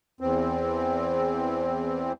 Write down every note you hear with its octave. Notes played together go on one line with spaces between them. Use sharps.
E2 C4